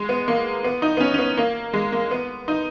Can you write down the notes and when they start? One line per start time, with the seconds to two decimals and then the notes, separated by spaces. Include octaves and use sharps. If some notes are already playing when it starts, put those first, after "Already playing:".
Already playing: G#3
0.09 B3
0.28 A#3
0.64 B3
0.82 D#4
0.97 B3
1.00 C#4
1.14 C#4
1.19 B3
1.37 A#3
1.73 G#3
1.92 A#3
2.11 B3
2.48 D#4